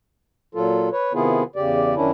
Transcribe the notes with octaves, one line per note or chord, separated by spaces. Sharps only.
A#2 F#3 F4 A4
B4 C#5
C3 D#3 B3 E4 F4 G#4
E2 C#3 G4 D5
F#2 D#3 C#4 D4 E4